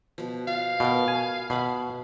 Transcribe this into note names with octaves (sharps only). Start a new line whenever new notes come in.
B2 F3
F4 F5
B2 B3 A#4 G5
G#5
B2 E5 F#5 B5